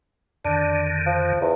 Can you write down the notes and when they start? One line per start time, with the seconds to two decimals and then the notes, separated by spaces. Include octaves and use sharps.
0.45 F2 D3 D#3 D4
1.06 F3
1.41 E2